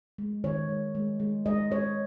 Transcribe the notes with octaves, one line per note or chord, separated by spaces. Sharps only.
G#3
D#3 C#5
G#3
G#3
G#3
G#3 D#5
G#3 C#5